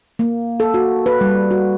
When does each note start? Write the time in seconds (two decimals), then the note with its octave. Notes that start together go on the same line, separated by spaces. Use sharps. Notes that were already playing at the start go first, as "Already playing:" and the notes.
0.19 A#3
0.60 A4
0.74 F#4
1.06 B4
1.21 G3
1.51 F#4